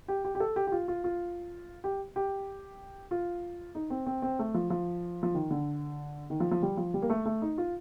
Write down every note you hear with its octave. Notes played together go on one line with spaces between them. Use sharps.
G4
G4
G4
A4
G4
G4
F4
F4
F4
G4
G4
F4
D#4
C4
C4
C4
A3
F3
F3
F3
D#3
D3
D#3
F3
F3
G3
F3
G3
A#3
A3
A3
D#4
F4